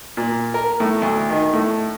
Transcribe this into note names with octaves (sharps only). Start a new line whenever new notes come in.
A#2
A#4
A2
D2
D#3
A2